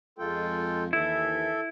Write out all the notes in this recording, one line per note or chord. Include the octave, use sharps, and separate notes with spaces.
F2 G#3 F4 A4 G5
D#2 E3 E4 A4 E5